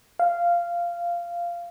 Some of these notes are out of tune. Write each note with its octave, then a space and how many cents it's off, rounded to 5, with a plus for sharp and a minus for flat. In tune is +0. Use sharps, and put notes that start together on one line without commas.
F5 -10